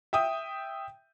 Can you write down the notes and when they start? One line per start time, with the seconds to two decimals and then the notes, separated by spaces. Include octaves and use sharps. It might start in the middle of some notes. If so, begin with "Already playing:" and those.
0.13 E5 G5 D#6